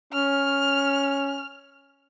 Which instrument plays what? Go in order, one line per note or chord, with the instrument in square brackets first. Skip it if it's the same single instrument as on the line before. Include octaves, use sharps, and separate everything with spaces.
[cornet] C#4 [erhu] F6